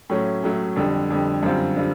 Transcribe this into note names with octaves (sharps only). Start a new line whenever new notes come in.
A2 F#3 A3 C#4
A2 F#3 A3 C#4
F2 D3 G3
F2 D3 G3
F#2 D3 G3 C4 F4
D3 G3 C4 F4